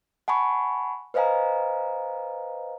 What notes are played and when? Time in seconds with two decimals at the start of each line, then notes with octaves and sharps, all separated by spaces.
0.28 F#5 G#5 A5 B5 C#6
1.14 B4 C5 D#5 F5 G#5 A#5